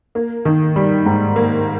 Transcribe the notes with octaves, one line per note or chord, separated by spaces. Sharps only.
A#3
D#3
G3
G#2
A#3